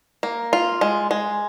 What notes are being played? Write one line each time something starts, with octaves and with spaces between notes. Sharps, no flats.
A#3
F4
G#3
G#3